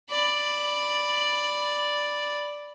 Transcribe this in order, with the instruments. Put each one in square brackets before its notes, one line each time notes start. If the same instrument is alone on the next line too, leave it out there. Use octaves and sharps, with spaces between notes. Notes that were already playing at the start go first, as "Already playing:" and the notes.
[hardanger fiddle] D5 B5